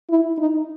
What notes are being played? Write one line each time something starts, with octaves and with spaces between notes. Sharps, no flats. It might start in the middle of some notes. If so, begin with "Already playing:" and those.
E4
D#4